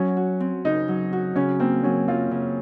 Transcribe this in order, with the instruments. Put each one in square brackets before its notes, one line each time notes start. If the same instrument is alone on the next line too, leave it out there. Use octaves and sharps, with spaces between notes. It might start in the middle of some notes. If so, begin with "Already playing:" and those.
Already playing: [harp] F#3 [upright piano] C#4
[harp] F#4
C4
[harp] C#3 [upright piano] D#4
[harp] F#3
F#4
[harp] C#3 [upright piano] C#4
[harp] A#3 [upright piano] C4
[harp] F#3 [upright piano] C#4
[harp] F#2 [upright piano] F4
[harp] C#3